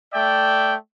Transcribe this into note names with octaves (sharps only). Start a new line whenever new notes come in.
A3 D5 E5 G5